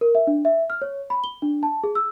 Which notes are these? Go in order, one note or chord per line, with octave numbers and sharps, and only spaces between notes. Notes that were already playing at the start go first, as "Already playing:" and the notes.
A#4
E5
D4
E5
F6
C#5
B5
G7
D4
A5
G#4
E6